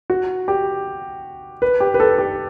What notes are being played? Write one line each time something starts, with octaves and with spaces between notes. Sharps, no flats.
F#4
G4
B4
G4
B4
A4
G4